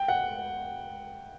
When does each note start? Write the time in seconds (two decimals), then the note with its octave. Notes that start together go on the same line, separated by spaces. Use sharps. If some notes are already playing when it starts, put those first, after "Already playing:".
Already playing: G5
0.08 F#5